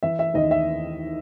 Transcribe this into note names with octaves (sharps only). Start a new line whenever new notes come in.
E3 E5
E5
D#2 D#5
E5